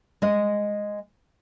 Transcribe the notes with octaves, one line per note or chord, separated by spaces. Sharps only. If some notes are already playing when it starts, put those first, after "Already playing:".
G#3 D#5